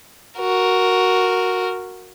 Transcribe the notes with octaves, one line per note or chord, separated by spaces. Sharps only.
F#4 A#4